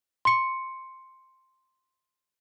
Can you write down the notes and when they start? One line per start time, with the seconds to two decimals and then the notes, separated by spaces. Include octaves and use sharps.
0.25 C6 C#7